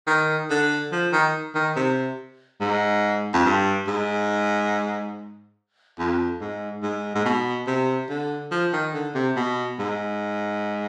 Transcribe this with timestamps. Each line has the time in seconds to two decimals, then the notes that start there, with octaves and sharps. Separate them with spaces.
0.07 D#3
0.50 D3
0.92 F3
1.13 D#3
1.55 D#3
1.76 C3
2.60 G#2
3.33 F2
3.45 G2
3.87 G#2
5.99 F2
6.41 G#2
6.83 G#2
7.15 G#2
7.25 B2
7.67 C3
8.09 D3
8.51 F3
8.73 D#3
8.93 D3
9.15 C3
9.36 B2
9.79 G#2